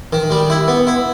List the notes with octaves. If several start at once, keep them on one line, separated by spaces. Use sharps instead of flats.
D#3
G3
E4
B3
E4